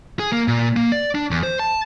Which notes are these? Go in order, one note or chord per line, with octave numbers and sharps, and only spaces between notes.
G#4
A#3
A#2
A#3
D5
D4
E2
C5
A5